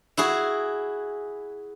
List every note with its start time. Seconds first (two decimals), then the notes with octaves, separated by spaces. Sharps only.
0.17 E4 F#4 G#4